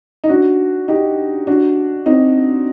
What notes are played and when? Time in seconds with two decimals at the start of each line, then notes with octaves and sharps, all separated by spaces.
0.24 D#4
0.29 D4 F#4
0.88 D#4 G4
1.47 D4 F#4
2.06 C4 D#4